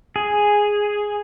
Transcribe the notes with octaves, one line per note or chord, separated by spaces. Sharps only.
G#4